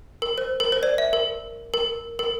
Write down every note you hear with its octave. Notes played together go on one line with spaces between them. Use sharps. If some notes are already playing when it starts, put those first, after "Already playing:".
A#4
C5
A#4
C5
D5
E5
A#4
A#4
A#4